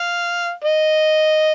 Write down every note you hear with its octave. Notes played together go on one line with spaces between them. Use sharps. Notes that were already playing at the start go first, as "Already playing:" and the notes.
Already playing: F5
D#5